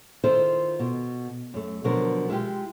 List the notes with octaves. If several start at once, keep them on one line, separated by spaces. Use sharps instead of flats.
D#3 E4 F4 A4 C5
B2
F#2 A3
B2 D3 F3 F#3 A#4
G#3 E4 F4 G4